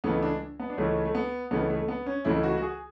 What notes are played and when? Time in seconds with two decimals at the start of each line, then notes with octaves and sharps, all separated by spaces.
0.04 C#2 C#3 E3 A3 B3
0.23 D4
0.60 B3
0.70 D4
0.78 C#2 C#3 E3 A3 C#4
1.05 A3
1.15 B3
1.51 C#2 C#3 E3 A3 B3
1.70 A3
1.88 B3
2.06 C#4
2.25 C#2 C#3 E3 A3 E4
2.43 F#4
2.58 F#4
2.62 G#4